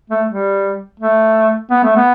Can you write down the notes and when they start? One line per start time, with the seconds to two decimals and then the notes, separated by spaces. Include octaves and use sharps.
0.10 A3
0.28 G3
1.00 A3
1.71 B3
1.84 A3
1.97 B3